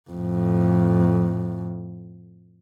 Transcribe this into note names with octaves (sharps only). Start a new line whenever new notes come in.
F2 A2